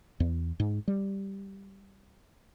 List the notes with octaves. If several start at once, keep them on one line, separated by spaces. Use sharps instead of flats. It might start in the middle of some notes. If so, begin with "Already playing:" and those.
E2
G#2
G3